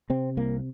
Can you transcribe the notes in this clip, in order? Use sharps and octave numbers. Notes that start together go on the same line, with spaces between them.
C3 C4
C2 A#3